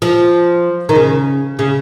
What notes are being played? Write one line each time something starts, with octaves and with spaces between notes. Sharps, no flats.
F3
D#3
C#3
C#3